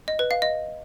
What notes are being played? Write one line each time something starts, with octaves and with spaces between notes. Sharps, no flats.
D#5
B4
F5
D#5